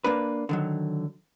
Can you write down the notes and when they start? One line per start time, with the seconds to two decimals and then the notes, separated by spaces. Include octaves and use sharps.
0.04 A#3 D4 B4
0.49 D3 D#3 F#3